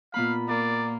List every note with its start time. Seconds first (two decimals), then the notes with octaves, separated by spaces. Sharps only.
0.14 A#2 B3 F5 B5
0.49 A#3 D5